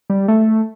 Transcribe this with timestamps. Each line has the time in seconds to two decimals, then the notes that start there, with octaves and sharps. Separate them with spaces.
0.10 G3
0.28 A3